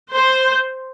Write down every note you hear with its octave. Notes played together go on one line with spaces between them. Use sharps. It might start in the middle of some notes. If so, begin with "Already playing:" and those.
C5